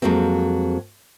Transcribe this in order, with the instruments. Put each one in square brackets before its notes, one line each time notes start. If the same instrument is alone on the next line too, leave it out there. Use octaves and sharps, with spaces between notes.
[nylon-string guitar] F2 F#3 G#3 A#3 C4